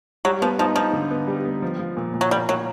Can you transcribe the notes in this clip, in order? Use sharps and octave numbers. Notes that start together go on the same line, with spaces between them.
F#3 G3
F3 B3
F3 D#4
F3 D#4
D3
B3
G3
B3
F3
F3
A#2
A#2
F#3
G3 A#3
F#3 A#3